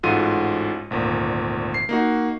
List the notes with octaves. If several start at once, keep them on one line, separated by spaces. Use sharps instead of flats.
A1 G#2 F4 F#4 A4 D#7
G#1 D2 A#2
C7
A#3 D#4 F#4